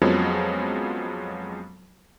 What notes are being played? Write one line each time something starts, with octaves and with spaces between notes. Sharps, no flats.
F2 F3 F#3 G#3 B3 C#4